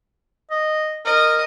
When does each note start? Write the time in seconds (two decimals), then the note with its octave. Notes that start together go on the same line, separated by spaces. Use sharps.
0.51 D#5
1.05 A#4 D#5